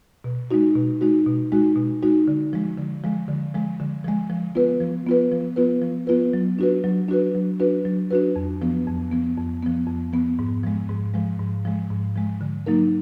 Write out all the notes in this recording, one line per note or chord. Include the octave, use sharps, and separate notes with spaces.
B2
G#3 D#4 F#4
B2
G#3 D#4 F#4
B2
G#3 D#4 F#4
B2
G#3 D#4 F#4
D3
F3 G#3
D3
F3 G#3
D3
F3 G#3
D3
F3 G#3
F3
B3 F4 B4
F3
B3 F4 B4
F3
B3 F4 B4
F3
B3 F4 B4
F#3
D4 F#4 B4
F#3
D4 F#4 B4
F#3
D4 F#4 B4
F#3
D4 F#4 B4
F2
F3 B3
F2
F3 B3
F2
F3 B3
F2
F3 B3
G#2
F3 G#3
G#2
F3 G#3
G#2
F3 G#3
G#2
F3 G#3
D3
F#3 A#3 D#4 A#4